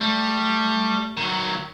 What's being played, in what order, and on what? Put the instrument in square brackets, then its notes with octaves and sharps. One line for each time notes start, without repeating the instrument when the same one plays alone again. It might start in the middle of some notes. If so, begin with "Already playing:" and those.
[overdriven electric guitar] G3 [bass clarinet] A3
[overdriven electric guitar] D#3 F#3